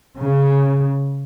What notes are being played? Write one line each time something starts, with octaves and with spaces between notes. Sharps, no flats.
C#3